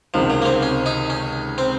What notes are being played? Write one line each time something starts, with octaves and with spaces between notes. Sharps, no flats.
C#2 C3 D#3 F3
F#3
A#3
C4
C#4
D#4
C#4
C4